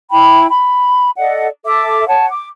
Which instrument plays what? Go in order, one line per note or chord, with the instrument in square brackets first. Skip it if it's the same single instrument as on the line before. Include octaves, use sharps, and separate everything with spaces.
[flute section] E4 G5 B5
B5
A4 D5 D#5 F#5
A4 E5 D6
C#5 F#5 A5
D6